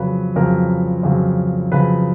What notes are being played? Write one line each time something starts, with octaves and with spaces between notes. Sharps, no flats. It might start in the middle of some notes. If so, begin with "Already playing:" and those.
Already playing: F2 C#3 F#3 B4
F2 C#3 F#3 A#4
F2 C#3 F#3
F2 C#3 F#3 B4